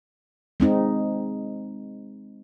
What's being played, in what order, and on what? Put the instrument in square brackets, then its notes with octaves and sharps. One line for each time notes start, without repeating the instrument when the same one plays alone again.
[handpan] G#3 C4 D#4